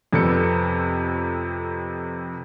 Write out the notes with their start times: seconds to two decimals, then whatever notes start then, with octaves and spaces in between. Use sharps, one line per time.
0.13 F2 C3 B3 A4 D5 C#7